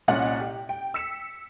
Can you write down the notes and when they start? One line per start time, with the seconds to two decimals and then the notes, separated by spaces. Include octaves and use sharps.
0.08 C2 A#2 C#4 D#5 F#5 F#7
0.40 G4
0.69 G5
0.94 E6 B6 C#7 E7